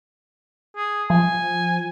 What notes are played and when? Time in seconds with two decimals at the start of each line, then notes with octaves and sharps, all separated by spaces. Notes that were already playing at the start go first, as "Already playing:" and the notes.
0.76 G#4
1.10 F3 G#5